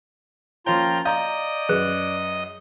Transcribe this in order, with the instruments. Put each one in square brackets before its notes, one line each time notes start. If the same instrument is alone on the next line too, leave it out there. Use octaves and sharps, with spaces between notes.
[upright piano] F3 A#3 C#4 [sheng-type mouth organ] F4 A#5 [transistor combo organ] G5
[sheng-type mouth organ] D5 [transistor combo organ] D#5 [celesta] F5 A#5 D#6 [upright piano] G6
[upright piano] F#2 [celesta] G#4 B4 F#6